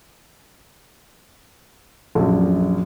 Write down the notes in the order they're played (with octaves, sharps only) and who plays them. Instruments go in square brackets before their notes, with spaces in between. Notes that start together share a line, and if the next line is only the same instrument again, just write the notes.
[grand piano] A#1 F#2